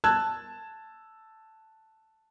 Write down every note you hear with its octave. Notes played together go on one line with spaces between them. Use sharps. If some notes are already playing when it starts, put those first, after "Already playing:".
A5 E6 F#6 G#6